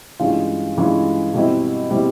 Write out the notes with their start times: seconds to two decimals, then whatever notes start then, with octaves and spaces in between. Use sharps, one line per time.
0.20 G2 E3 G#3 C#4 F4
0.77 G2 E3 G#3 C#4 F4
1.34 B2 G3 C4 E4
1.91 B2 G3 C4 E4